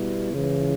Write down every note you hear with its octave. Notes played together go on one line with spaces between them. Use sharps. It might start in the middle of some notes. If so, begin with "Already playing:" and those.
Already playing: B2 G3 B3 E4
C#2 C#3 E3